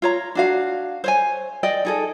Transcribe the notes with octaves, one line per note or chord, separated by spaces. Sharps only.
F4 C#5 A#5
D4 F#4 F5
C5 C#5 G#5
D5 D#5 G5
D#4 G#4 A4